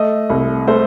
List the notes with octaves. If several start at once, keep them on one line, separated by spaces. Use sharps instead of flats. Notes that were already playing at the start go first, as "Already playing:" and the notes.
Already playing: A3 D#5
C2
A3 C5